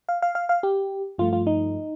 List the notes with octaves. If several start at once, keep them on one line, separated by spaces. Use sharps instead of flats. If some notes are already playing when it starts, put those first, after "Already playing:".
F5
F5
F5
F5
G4
G2 F3 A3 F4
F4
D#4